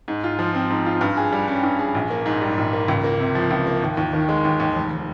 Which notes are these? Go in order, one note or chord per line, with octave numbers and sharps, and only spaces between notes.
G#2
F4
F3
C4
G#2
F4
G2
G#4
G3
C#4
G2
G#4
A#1
A#3
G#2
G3
A#1
A#3
C#2
A#3
C3
F3
C#2
A#3
D#2
D#2
D#3
G#3
D#2
D#2
F1